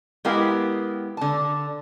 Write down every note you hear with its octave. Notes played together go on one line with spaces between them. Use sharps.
G#3 B3 E4 G4 A#4 F5
D3 A5